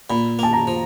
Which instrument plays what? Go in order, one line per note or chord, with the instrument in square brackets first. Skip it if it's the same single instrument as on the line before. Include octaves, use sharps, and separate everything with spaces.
[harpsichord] A#2 [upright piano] B5
[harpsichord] A#3 [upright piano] A5
[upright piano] A#5
[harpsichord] F3